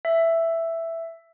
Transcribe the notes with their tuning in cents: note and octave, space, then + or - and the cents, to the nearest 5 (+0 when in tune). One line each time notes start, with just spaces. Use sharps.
E5 +5